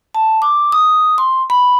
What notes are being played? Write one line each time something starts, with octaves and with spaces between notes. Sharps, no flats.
A5
D6
D#6
C6
B5